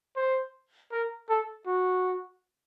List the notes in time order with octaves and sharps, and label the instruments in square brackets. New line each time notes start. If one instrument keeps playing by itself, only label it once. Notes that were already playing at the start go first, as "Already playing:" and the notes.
[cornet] C5
A#4
A4
F#4